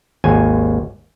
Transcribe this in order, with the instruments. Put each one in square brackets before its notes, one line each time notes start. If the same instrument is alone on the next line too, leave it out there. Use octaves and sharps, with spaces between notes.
[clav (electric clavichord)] G#1 D#2 G#5